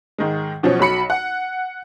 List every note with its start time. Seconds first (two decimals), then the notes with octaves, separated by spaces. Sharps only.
0.18 G#2 D#3 G#3
0.63 B2 F3 F#3 C#4
0.80 B1 F#3 B5 C#7
1.10 F#5